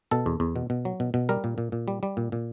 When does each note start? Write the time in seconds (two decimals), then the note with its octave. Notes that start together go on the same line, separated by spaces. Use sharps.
0.11 B2 A4
0.26 E2
0.40 E2
0.56 B2
0.70 B2
0.85 F#3
1.00 B2
1.14 B2
1.29 G3 A#4
1.44 A#2
1.58 A#2
1.72 A#2
1.88 G3
2.03 G3
2.17 A#2
2.32 A#2